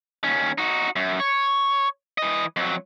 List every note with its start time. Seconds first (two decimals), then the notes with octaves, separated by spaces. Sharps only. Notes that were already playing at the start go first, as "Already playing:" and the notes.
0.24 D#2 C#4
0.58 D#4 F#4
0.96 F#2
1.20 C#5
2.18 E3 D#5
2.56 F2 F#3